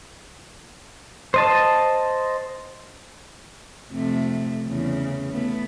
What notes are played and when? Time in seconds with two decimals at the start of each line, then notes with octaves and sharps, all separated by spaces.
1.34 C5 D#5 A5
3.91 F2 C3 A3
4.67 E2 C#3
5.32 A3 B3